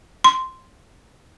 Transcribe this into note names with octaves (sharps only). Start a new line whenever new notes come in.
C6